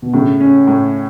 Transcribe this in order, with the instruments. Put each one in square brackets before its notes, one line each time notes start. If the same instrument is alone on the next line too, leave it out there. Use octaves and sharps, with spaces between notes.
[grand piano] B2
[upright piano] A2 [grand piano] C#3
[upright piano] C#4
A2